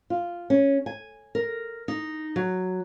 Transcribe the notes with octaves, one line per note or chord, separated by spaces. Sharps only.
F4
C#4
G#5
A#4
D#4
F#3